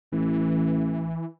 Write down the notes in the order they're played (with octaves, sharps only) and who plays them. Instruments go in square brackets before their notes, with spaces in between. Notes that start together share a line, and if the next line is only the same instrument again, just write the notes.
[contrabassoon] A1 [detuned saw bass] E3